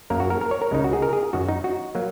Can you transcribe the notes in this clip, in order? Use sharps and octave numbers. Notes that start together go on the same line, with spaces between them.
F#2 F#3 A#3 A#4
F#4
A#4
A#4
C#5
A#4
C#2 C#3 G#3 D#4
F#4
G#4
A#4
G#4
F#2 D#3 F#3 F#4
D#4
F#4
F#3 A#3